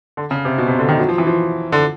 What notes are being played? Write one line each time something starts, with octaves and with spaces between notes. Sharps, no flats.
D3
C#3
C3
B2
C3
D3
D#3
F#3
F3
E3
F3
D3